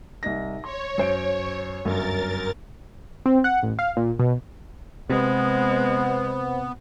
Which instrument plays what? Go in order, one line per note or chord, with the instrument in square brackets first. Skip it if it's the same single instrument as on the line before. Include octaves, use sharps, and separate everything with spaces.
[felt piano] C2 D#4 A#6
[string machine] C#5 [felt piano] C6
[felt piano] F#2 C5 D7
[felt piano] G1 F#2 [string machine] A#4 A6
[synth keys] C4
F#5
A1
F5
A#2
B2
[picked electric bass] C3 [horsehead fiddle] G#3 [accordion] B3 [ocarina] C5